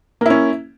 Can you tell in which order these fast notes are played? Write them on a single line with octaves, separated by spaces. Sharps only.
A#3 E4 C#4